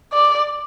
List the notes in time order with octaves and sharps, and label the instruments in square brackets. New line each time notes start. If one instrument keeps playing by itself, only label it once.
[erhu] D5